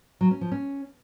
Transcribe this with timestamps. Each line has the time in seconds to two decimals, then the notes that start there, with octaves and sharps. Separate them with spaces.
0.21 F#3
0.31 C#4
0.41 F3
0.52 C#4